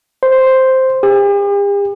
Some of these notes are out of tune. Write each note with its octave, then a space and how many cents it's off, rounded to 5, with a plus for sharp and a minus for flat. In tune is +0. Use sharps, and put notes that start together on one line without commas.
C5 +0
G4 +45